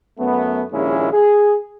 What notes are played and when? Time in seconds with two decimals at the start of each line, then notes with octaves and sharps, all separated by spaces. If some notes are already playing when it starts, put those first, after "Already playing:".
0.19 F#2 A3 B3
0.73 A#1 D#2 G#3 C#4 E4
1.13 G#4